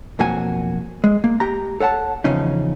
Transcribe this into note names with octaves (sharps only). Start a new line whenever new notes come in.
B1 F2 A#3 F#4 G#5
G#3
A#3
G4 A#5
A4 C#5 F#5 A5
E2 C#3 F3 C#4 D#4